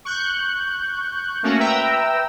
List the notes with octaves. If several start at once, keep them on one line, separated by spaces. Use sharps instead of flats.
C#6 F#6 G6
A3 A#3 C#4 F#4
B4 E5 G5 A#5 E6